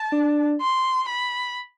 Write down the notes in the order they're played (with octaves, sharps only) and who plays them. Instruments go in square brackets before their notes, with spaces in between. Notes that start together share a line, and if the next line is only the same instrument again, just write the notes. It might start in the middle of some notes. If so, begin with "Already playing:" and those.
Already playing: [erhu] A5
[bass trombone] D4
[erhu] C6
B5